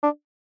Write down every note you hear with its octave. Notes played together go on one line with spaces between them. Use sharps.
D4